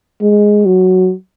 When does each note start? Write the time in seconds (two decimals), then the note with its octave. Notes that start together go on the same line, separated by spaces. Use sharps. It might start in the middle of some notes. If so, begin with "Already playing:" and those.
0.21 G#3
0.65 F#3